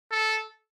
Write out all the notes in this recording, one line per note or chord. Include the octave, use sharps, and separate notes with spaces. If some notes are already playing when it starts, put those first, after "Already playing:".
A4